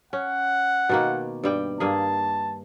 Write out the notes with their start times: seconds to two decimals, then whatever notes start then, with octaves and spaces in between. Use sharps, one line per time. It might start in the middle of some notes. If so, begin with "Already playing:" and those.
0.13 C#4 F#5
0.89 B2 D#3 A#3
1.43 G2 G3 G5
1.80 G2 A#3 G#4 A5